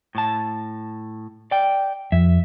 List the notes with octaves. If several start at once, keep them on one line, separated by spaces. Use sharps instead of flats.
A2 A5
D5 G5
F2 E5